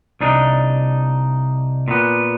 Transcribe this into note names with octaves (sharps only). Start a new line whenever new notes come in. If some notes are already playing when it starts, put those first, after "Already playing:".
C2 D4 D#4
A#2 B3